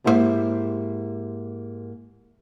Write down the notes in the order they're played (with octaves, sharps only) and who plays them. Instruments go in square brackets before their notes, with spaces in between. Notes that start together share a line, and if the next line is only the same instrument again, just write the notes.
[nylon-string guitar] G#2 A#3 E4 F4 G4 C5